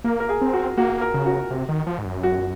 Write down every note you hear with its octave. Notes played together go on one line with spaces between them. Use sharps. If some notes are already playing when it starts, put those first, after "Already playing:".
A#3 A#4
A#4
G#4
C4
F#4
A#3 F#4
A#4
C#3
F#4
C3
D#3
F3
G#2
F#2
F#4